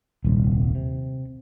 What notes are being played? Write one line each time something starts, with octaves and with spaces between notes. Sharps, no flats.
D#1 C2
C3